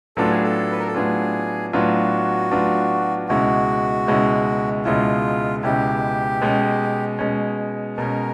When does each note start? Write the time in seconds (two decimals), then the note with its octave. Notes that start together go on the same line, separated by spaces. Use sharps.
0.17 A2 F#3 B3 D4 F4 A4
0.30 G#4
0.43 A4
0.72 B4
0.79 A#4
0.87 A4
0.94 A2 F#3 B3 D4 F4 G#4
1.73 A2 F#3 B3 D4 F4 F#4
2.51 A2 F#3 B3 D4 F4
3.28 C#2 B2 G#3 C#4 E4 F#4
4.07 C#2 B2 G#3 C#4 E4
4.85 C#2 B2 G#3 C#4 E4 F4
5.63 C#2 B2 G#3 C#4 E4 G4
6.41 B2 G#3 C#4
7.19 B2 G#3 C#4
7.97 B2 G#3 C#4 A#4